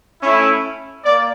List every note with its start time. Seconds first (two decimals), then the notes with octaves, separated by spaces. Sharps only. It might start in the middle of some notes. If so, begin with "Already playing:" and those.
0.22 A3 C#4 E4
1.03 A#3 D5